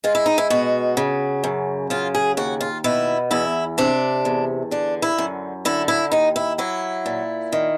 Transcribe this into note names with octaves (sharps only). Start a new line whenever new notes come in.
G#3 F4
E4
D#4
E4
B2 F#4
C#3
F#2
C#3 F4
G#4
D#2 F#4
F4
B2 E4
E2 E4
C3 D4
E2
D3 D4
E4
F#2
D3 E4
E4
D#2 D#4
E4
F#3 E4
A#2
D#3